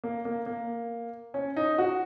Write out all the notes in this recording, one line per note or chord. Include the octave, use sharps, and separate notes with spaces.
A#3
A#3
A#3
C#4
D#4
F#4